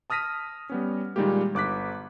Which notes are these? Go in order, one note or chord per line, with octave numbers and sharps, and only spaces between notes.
A5 D#6 F6 A#6 B6 D#7
G3 B3 C#4
A#2 D#3 G3 G#3 A#3 G4
G1 D6 F#6 B6